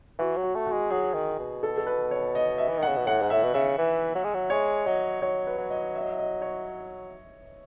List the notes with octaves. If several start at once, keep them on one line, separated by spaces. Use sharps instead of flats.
E3 F#4
F#3
F#4
A3
F#4
G#3
F#3 G#4
D#3
B2
A4
A4
B4
C#5
D#5
E5
E3
D#3
F#5
C#3
B2
A2 F#5
G#2
A2 E5
B2
C#3 E5
E3
F#3
G#3
F#3
G#3 C#5
F#3 D#5
F#3 C#5
B4
F#3
D#5
E5
D#5
E5
D#5
C#5